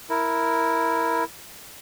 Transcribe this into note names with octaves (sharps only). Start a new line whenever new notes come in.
E4 A#4